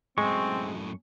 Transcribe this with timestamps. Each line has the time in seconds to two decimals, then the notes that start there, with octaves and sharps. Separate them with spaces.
0.18 F#2 A2 G#3 C4 C#6